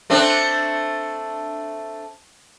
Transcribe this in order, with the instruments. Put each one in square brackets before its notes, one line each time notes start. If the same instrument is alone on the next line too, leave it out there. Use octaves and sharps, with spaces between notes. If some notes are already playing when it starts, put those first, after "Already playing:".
[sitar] A3 C4 D4